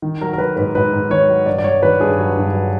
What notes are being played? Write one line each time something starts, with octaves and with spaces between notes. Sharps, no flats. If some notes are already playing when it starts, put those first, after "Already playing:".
D#3
F#3 A#4
A#4
F#3 B4
G#2 B4
G#2 B4
G#2
D#3 C#5
F#3
G2 D5
D5
F#3 C#5
D#3 B4
G2 G#4
F#3
G2
F#3